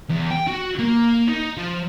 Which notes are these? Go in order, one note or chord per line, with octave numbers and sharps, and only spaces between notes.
E2
G5
F#4
A#3
D#4
F3